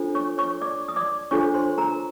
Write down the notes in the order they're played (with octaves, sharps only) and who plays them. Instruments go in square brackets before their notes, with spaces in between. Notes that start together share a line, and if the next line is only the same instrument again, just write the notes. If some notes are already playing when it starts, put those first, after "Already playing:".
Already playing: [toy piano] D4 F4 A4 C5
C#5 C#6
C#5 C#6
D5 D6
D#6
D5 D6
D4 F4 A4 C5 C#5 C#6
C5 C6
A#4 A#5